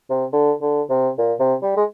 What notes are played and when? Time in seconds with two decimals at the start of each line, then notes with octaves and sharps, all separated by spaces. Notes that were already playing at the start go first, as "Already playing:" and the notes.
0.10 C3
0.32 D3
0.62 D3
0.90 C3
1.18 A#2
1.40 C3
1.62 G3
1.77 G#3